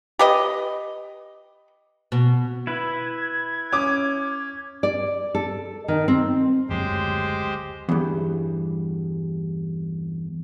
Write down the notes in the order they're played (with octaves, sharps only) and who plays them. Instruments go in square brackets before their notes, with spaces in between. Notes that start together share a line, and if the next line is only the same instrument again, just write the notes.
[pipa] G4 B4 D#5
[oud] B2
[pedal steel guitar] E4 B4 [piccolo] G#6
[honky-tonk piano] C#4 D6
[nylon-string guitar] D5
A4
D#3
C4
[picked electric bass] F#1 D2 F#3 [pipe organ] G#3 G4 C5
[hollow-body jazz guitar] E2 G2